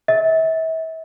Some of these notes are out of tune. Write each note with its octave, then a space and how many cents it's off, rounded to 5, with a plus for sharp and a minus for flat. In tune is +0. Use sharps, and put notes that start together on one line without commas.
E5 -35